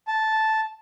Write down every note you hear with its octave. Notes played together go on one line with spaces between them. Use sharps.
A5